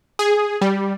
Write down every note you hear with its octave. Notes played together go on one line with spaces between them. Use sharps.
G#4
G3